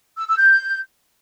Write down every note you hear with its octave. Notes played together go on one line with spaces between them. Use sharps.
E6
E6
G6